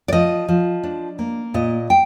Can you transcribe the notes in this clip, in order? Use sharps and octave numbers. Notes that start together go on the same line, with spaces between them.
D5
F3 D#5
F3
D4
A#3
A#2 D#5
G5